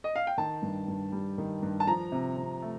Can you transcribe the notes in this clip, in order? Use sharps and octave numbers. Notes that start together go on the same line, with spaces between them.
D#5
F5
G5
D#3 A5
G2
G2
G3
D#3
G2
A5
F3 A#5
C3
C3
A3